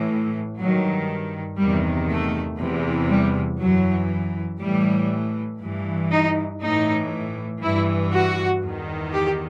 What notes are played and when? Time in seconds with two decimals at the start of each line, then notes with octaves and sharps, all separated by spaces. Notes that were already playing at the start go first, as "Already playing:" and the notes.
Already playing: A2 E3
0.58 G2 D#3 F#3
1.58 E2 C3 D#3 G3
2.08 A3
2.59 E2 C3 E3
3.10 G3
3.59 F#2 E3 F#3
4.60 A2 E3 G3
5.61 G2 E3
6.11 D#4
6.61 A2 E3 D#4
7.61 G2 E3 E4
8.12 F#4
8.62 E2 D#3
9.12 G4